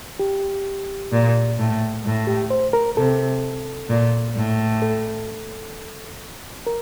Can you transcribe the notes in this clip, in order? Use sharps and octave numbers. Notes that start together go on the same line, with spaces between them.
G4
A#2
A2
A2
G4
C5
A#4
C3 A4
A#2
A2
A4
A#4